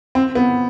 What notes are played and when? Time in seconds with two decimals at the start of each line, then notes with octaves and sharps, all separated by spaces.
0.15 C4
0.35 B3